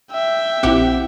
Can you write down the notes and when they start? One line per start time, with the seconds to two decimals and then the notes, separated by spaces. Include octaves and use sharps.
0.12 E5 G5
0.63 A#1 C4 E4 G4 F#5